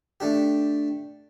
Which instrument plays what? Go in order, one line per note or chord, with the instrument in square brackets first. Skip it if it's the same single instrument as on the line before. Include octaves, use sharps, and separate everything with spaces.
[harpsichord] A3 D4 G4